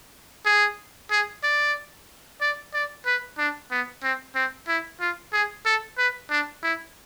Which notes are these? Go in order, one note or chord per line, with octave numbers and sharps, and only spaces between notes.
G#4
G#4
D5
D5
D5
B4
D4
B3
C4
C4
E4
F4
G#4
A4
B4
D4
E4